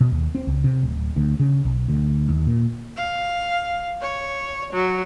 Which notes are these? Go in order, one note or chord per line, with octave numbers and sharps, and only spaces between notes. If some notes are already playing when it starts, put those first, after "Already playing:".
B2
D#2
C4
C#2
C3
D1
D2
C#3
B1
D2
D#2
A#2
F5
C#5
F#3